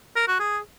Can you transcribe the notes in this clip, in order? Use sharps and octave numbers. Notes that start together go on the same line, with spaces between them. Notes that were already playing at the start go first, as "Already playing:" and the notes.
A#4
F#4
G#4